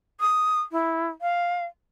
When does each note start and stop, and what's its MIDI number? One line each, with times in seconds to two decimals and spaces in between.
0.21 0.61 87
0.72 1.08 64
1.22 1.65 77